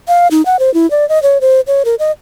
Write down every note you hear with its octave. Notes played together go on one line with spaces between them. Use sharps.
F5
D#4
F#5
C5
E4
D5
D#5
C#5
C5
C#5
A#4
D#5